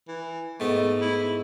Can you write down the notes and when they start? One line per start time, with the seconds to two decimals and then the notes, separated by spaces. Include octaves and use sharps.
0.08 E3
0.60 G#2 A3 B3
1.01 E4